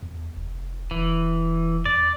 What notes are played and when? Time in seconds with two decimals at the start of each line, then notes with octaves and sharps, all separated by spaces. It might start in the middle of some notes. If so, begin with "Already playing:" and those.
0.03 E2
0.37 F1
0.91 E1 E3
1.85 E2 D5